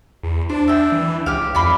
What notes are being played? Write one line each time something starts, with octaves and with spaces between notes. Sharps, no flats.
E2
D4 C5
E5 G5
E3
C#2 G4 F5
F2 D5 B5